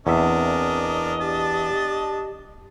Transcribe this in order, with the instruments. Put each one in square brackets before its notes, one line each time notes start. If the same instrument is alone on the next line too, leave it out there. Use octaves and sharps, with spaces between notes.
[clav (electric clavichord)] E2 E5 [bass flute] C4 [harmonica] D4 A#4 [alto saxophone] D#5
[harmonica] D4 A5 [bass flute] G4